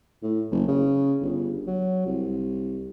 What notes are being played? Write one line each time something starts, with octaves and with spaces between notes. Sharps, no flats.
A2
F#1
C#3
G1
F#3
C2